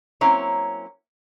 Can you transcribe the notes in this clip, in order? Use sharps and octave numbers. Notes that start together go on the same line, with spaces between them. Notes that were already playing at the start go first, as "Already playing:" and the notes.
F#3 A#3 C4 C#4 E4 C#5